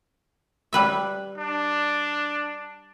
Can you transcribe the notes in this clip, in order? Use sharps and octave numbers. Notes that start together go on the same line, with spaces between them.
G3 B4 E5
D4